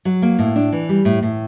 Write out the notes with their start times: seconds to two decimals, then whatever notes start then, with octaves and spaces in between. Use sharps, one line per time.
0.05 F#3
0.22 A#3
0.39 A2
0.56 D4
0.73 E3
0.89 G3
1.05 A2
1.23 A2